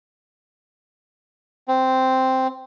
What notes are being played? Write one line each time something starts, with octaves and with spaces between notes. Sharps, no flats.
C4